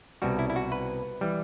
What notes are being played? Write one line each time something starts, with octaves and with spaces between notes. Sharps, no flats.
C2 B2 G3 F#4
E4
E4
F#4
B4
E3 G3